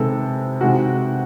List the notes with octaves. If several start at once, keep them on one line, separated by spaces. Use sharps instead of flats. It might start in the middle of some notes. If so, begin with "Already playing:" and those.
Already playing: C3 D#3 G#3 A4 B4
C3 D#3 G#3 F#4